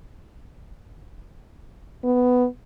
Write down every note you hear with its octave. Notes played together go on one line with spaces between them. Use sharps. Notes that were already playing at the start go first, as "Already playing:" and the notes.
B3